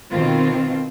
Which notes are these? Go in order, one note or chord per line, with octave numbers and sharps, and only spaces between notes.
B2 D#3 C4 F4